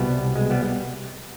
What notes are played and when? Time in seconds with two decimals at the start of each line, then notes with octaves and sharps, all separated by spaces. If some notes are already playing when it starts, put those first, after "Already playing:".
Already playing: C2 B2 G3 B3
0.36 G#3
0.50 G3 B3